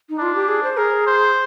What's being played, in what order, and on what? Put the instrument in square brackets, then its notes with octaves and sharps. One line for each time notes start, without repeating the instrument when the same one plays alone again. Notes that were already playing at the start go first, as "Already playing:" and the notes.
[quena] D#4
[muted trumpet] D4 [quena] F4
[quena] G4
G#4
C5
[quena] G#4 [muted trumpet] A#4
[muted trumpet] C5